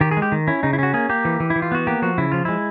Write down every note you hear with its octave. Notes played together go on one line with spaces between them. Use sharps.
D#3 G4
G#4
G#3
G4
D#3
C#4 E4
C#3 D#4
E4
C#4 F#4
A#3 G#4
A#3 G4
E3
E3
E4
E3
F4
B3 F#4
A#3 G4
F3 F#4
C#3 E4
F3 F4
G#3 E4